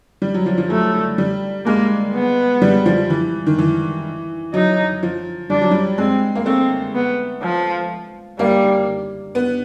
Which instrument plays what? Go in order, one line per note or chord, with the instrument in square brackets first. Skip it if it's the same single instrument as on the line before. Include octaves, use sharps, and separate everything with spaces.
[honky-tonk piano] G3
F#3
F3
F3
[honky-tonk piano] F#3 [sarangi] A3
[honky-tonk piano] G3
[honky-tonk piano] G#3 [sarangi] A#3
[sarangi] B3
[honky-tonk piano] G3
F3
E3
D#3
E3
[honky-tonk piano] F#3 [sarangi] D#4
[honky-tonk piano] F3
[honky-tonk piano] G3 [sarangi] D4
[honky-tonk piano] F#3
G3
[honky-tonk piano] G#3 [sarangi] C4
[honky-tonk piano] A#3
[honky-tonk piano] A3 [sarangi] C4
[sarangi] B3
F3
[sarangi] G3 [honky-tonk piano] A#3
[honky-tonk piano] B3